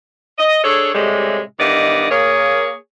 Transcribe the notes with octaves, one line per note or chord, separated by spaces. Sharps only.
D#5
D4 G#4 A4 C#5
A2 C3 G3 G#3
G2 D#3 E3 B3 D5 D#5
A#3 G#4 C#5